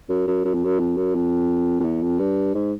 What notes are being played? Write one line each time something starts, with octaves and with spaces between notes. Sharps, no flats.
F#2
F#2
F#2
F2
F#2
F2
F#2
F2
F2
E2
F2
G2
G#2